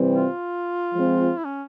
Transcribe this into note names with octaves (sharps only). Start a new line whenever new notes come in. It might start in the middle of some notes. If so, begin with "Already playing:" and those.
Already playing: C3 E3 G3 C4
F4
F3 G#3 C4
E4
C#4